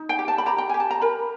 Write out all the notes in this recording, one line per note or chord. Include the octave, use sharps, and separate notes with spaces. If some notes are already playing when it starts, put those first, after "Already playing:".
Already playing: D#4
G5
G4
A5
B5
G4 A#5
G5
G4 G#5
A5
A#5
A#4 B5